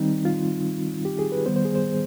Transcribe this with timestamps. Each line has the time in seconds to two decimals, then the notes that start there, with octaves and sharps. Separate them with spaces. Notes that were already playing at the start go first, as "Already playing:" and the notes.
Already playing: D#3 G3 C4 D#4
0.25 F4
1.05 G4
1.19 G#4
1.32 B4
1.46 D#3 G3 B3 C5
1.56 C5
1.65 G#4
1.75 C5